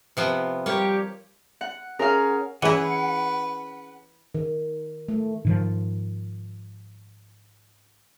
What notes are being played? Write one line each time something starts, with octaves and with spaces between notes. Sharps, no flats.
C3 F3 B3
G3 A#3 G4 C#5
F#5
C#4 G#4 A#4 F5
E3 C#4 E4 G#4 B4 F#5
D#3
A3
G#2 D#3 F3